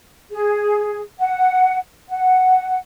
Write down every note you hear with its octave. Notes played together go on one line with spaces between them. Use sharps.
G#4
F#5
F#5